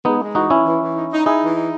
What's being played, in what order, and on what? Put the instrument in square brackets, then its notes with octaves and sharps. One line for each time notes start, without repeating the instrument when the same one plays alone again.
[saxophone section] G#3 [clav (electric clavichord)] B3 D#4
[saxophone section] G#3
[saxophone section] E3 [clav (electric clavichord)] D#4 F#4
[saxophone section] E3 [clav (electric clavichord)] C#4 E4
[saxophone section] E3
E3
D#4
D#4
[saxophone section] D#4 [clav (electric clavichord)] E4 G#4
[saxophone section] E3
D#4